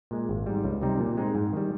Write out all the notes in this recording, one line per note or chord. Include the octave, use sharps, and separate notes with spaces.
A#2 G#3
G#1
G#2 G3
C#2
C3 G3 C4 D#4
A#2
G#3 C4 D#4
G#2
D#3 G3